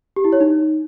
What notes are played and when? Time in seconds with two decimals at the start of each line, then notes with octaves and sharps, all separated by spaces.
0.16 G4
0.24 E4
0.33 C#5
0.41 D#4